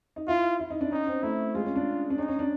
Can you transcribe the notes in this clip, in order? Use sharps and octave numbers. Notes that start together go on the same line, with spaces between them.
D#4
E4 F4
E4
D#4
D4
C#4 D#4
C4
A3 E4
G#3 F4
C#4
D4
D4
C#4 D#4
C#4
D4